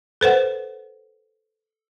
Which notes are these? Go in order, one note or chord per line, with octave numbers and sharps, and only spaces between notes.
A4 B4 C5 F#5